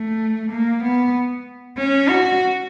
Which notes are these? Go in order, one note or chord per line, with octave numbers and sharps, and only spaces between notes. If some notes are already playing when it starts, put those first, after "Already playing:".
Already playing: A3
A#3
B3
C#4
F#4